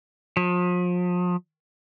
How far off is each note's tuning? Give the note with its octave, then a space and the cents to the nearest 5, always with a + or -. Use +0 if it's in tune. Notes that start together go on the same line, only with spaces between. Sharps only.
F3 +35